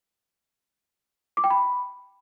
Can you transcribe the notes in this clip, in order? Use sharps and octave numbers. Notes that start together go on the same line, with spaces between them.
D6
G5
B5